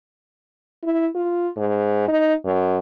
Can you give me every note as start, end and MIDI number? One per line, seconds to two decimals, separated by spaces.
0.83 1.07 64
1.15 1.49 65
1.57 2.04 44
2.08 2.34 63
2.45 2.78 42